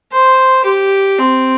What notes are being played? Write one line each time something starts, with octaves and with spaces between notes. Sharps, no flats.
C5
G4
C4